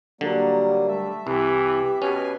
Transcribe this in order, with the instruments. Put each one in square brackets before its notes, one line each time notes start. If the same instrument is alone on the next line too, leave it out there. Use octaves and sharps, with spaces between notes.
[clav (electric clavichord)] D3 [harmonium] F#3 G3 A#3
[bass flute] G3 [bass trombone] A3 [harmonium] E5
[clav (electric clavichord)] C2 [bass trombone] E3 [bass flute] G4
[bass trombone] B2 [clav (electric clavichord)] C#4 [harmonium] B4 G#5